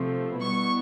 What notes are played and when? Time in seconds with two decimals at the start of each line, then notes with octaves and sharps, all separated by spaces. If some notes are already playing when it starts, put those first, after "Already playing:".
Already playing: C3 F3 A3 C4
0.40 B2 G3 B3 E4 C#6